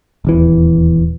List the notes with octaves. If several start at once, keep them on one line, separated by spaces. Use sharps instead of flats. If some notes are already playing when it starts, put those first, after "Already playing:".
D#1 E2 E3